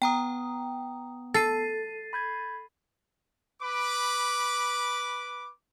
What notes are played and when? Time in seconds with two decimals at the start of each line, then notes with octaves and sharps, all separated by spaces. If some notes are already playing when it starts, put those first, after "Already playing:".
0.02 B3 G5 A#5 D#6
1.34 A4 A6 C7 D#7
2.13 B5 G6 G#6
3.62 B4 B5 D6